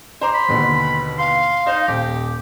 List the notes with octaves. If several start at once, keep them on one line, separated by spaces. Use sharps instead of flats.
C5 A#5 C6 D6
B5
D#2 B2 D3
F5 C6
D#4 C5
D#1 G4